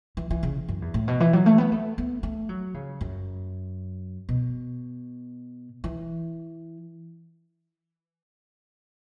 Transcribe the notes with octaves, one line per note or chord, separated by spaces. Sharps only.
E3
E3
C#3
F#2
E2
A2
B2
E3
F#3
A3
B3
A3
B3
A3
F#3
C#3
F#2
B2
E3